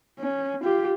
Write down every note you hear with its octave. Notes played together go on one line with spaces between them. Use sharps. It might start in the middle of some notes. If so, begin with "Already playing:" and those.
C#4
F4 G4